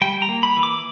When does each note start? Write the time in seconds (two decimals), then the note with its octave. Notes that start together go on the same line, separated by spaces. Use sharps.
0.01 G3 G5
0.22 A#5
0.29 A#3
0.43 B5
0.56 E3
0.63 D6